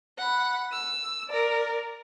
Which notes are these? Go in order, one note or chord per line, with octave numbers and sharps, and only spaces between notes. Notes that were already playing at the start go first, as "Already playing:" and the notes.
F#5 B5
E6
A#4 D5